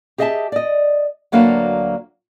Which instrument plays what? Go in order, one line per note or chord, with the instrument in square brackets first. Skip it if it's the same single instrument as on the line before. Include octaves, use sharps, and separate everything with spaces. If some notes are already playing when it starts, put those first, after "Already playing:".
[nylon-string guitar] G4 G#4 D#5 E5 G#5 A5
D5 D#5
D2 F#3 A#3 D4 B4 F5